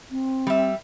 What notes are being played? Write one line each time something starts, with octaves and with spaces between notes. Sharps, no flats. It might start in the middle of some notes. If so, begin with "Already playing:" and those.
C4
G3 E5